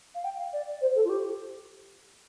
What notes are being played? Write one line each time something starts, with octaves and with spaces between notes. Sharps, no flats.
F5
G5
F5
D5
C5
A4
F4
G4